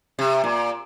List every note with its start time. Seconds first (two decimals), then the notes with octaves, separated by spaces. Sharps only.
0.19 C3
0.44 A#2